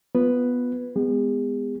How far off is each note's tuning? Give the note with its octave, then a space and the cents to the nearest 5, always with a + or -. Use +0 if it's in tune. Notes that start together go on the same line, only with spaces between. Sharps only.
B3 +0 F4 +0 B4 +0
G#3 +0 B3 +20 G#4 -40